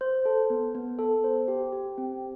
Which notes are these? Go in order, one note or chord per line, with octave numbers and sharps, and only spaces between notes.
C5
A4
B3
B3
A4
C5
G4
G4
C4